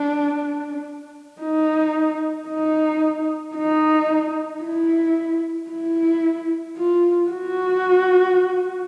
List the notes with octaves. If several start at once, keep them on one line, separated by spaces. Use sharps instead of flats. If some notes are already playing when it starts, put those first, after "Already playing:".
Already playing: D4
D#4
D#4
D#4
E4
E4
F4
F#4